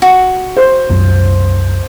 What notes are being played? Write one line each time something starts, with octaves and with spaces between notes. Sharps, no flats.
F#4
C5
C2 F#2 F#3